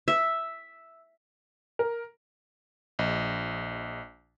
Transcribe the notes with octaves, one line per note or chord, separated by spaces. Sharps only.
E5
A#4
A#1 D#5